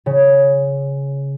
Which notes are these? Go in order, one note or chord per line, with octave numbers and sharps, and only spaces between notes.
C#3